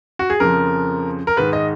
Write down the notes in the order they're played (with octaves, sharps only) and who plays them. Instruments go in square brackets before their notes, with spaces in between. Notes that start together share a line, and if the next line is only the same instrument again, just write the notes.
[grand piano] F#4
G#4
F2 C#3 F3 A#4
A#4
G#2 D#3 B4
D#5